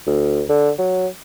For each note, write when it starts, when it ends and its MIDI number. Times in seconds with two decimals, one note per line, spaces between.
0.07 0.42 38
0.49 0.70 50
0.78 1.07 54